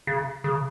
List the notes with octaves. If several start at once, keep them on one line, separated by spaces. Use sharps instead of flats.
C#3
C#3